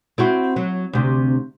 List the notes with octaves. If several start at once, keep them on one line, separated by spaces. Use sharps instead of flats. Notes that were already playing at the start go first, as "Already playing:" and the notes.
C4 E4 F#4
F#3
D2 C3